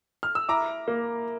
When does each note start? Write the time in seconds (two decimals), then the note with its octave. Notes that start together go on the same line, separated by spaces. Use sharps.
0.23 F6
0.35 E6
0.48 E4 A#5 D6
0.88 A#3